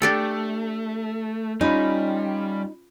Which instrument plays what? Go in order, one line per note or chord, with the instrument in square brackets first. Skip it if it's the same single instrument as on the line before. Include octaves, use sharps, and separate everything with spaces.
[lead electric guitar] A3 [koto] D4 G4 A4
[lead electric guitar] G3 [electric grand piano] C#4 F4 B5 [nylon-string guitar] D#4